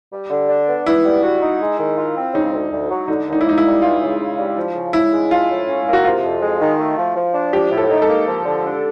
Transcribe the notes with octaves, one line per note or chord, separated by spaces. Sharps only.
G3
D3
D4
B3
B3 E4
G3
F#4
D#4
G#3
D#3
F4
C4
C#3 D#4
D2
D2
F#3
D3 D#4
D#2
D#4
E4
A#3 D#4
E4
G3
E3 F4
C#3
C#3
G3
F3
C#3
C#3 E4
G#3
F3 F4
A2
C#4
A#3
F#4
C3 F4
F2
G#3
D#3
A3
F3
F3
D4
F3 G4
A2
A4
D#4
A4
A#3
F3
D3
D4